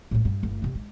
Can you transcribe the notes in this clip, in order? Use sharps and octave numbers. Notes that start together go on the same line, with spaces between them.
A2 A3
G2
G1 A3
C3 A#3
G#3